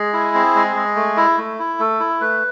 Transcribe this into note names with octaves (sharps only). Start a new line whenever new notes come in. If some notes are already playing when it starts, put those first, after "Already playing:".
Already playing: G#3 G#4
E4
C4
G#3
G#3
A3
E4
A3
E4
A3 A4
E4
A3 B4